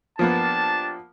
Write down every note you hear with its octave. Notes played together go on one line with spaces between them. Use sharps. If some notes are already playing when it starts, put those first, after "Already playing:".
F3 A#3 B3 D4 G4 A5